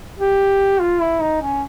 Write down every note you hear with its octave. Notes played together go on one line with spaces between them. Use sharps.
G4
F4
E4
D#4
C#4